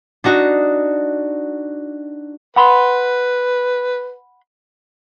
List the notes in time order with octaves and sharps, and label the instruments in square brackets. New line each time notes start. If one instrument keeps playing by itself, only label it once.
[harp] D4 D#4 F#4
[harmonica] B4 [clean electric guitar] F#5 B5 C6